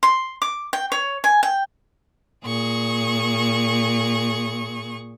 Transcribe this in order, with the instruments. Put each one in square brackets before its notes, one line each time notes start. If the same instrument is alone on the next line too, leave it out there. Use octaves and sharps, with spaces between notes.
[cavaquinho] C6
D6
G5
C#5
G#5
G5
[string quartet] A#2 G#4 C#6